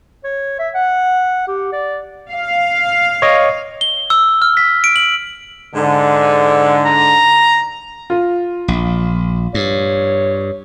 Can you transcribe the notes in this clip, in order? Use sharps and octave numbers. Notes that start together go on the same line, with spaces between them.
C#5
E5
F#5
G4
D5
F5
C#5 D#5
G7
E6
F6
B6
D7
F#7
G#2 D3
A#5
F4
A#1
G2 C#5